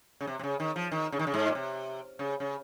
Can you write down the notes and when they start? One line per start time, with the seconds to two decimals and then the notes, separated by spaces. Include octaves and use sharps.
0.21 C#3
0.27 C3
0.39 C3
0.43 C#3
0.60 D#3
0.76 F3
0.92 D#3
1.12 C#3
1.19 D#3
1.27 C#3
1.34 G#2
1.48 A#2
1.55 C3
2.19 C#3
2.40 C#3